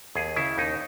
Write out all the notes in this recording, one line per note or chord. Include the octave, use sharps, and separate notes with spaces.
D#2 G#4
C#3 E4
D#2 D#4